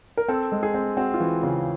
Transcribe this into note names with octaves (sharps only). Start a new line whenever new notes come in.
A#4
C4 A4
G#3
G#4
C4
C4 F#4
F4
E3 F#4
C#3 F4